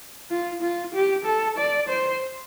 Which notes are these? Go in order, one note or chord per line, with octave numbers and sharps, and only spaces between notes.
F4
F4
G4
A4
D5
C5